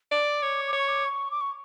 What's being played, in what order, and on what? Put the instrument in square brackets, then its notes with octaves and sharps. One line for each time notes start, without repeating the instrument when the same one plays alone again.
[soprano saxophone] D5 [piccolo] D6
[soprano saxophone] C#5
[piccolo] D6
[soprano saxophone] C#5
[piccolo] C#6
D6
C#6
D6
C#6